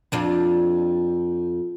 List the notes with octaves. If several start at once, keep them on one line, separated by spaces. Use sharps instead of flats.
F2 D4 F4